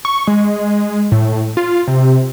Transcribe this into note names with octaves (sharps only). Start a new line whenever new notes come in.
C#6
G#3
A2
F4
C3